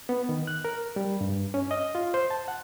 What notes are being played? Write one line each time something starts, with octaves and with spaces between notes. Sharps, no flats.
B3
D#3
F#6
A#4
G3
G2
C#4
D#5
F4
C5
A5
F#5